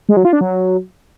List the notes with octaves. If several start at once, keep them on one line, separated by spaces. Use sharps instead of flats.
G#3
F#3
F4
D4
F#3